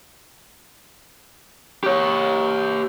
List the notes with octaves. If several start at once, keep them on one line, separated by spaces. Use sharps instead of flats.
G4 C#5